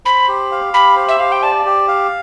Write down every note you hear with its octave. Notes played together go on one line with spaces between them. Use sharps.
C5 B5
G4
F5
G4 B5
C5
E5
G4 F5
G5
D5 A5
G4
F5